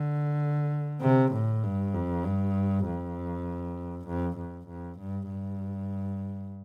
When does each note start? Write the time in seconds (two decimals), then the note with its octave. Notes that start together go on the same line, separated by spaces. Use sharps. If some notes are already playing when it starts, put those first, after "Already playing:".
Already playing: D3
1.02 C3
1.32 A2
1.63 G2
1.94 F2
2.24 G2
2.86 F2
4.07 F2
4.37 F2
4.68 F2
4.99 G2
5.29 G2